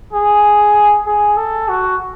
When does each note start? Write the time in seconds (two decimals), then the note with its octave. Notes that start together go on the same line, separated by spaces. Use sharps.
0.13 G#4
1.06 G#4
1.37 A4
1.68 F#4